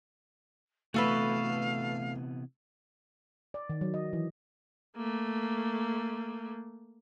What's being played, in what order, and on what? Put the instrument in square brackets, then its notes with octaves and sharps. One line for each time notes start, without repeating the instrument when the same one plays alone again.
[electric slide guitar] C3 E3 B3 [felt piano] A3 [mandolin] F#4 A4 B4 [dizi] F5
[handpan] D5
D#3
F#3
D#5
E3
[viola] A3 A#3